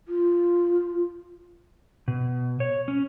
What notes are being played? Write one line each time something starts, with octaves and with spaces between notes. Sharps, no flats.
F4
B2
C#5
C#4